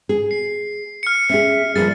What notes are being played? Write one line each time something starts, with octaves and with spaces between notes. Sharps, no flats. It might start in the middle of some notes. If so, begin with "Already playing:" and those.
G#4
C7
F6 C#7
C#4 G#4 E5
F3 G3 A#3 G#4 A6